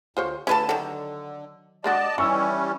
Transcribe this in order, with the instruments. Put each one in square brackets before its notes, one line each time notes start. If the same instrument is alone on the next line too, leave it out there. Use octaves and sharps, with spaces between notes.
[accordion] D2 [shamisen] F4 C5 C#5
[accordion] D3 [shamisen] A3 F4 A4 [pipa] C#4 B4 A5
[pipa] D#3 F#3 [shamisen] A4
[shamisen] G#3 D4 F#4 [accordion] D5 D#5 A5
[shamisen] D#3 [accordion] E3 G3 C#4 [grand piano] C#6 E6